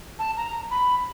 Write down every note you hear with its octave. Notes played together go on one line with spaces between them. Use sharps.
A5
A#5
B5